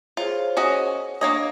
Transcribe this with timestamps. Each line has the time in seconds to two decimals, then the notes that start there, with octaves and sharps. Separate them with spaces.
0.17 F4 G#4 C5 C#5
0.57 C#4 F#4 D#5
1.21 A#3 D4 C#5 D#5